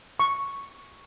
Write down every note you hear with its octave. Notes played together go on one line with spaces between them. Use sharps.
C#6